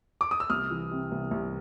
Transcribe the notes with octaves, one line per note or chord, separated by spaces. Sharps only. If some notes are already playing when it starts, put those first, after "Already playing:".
D6
D#6
E6
C2 D#6 F6
E3
C3
C2
C2